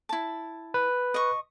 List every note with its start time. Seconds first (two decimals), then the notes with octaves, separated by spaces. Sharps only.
0.09 E4 A5
0.74 B4
1.14 D#5 C#6